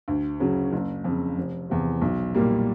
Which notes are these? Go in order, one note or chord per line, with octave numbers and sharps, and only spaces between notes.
D2
C#3 F#3
F#1
F2 C#3
F1
E2 C3
B1
A#2 G3 A#3